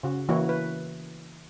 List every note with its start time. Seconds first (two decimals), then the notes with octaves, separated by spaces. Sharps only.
0.03 C#3 F#4
0.29 E3 A#3 E4 F#4 C#5
0.49 B4